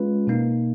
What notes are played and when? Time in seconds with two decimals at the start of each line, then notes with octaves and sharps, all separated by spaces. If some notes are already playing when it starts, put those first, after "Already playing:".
Already playing: G#3 C#4 F4 B4
0.27 B2 A#3 D#4